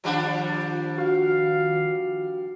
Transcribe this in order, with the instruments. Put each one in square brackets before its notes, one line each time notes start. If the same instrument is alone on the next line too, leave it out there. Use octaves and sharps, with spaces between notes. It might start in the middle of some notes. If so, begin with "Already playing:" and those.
[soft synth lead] D#3 [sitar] F3 G3 D4
[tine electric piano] F#4 [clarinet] F5